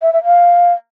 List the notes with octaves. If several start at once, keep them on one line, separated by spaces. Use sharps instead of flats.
E5
E5
F5